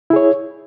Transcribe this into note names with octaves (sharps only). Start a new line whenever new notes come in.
E4 G#4 C#5